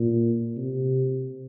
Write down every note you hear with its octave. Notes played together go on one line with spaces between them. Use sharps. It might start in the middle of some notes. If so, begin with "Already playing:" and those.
Already playing: A#2
C3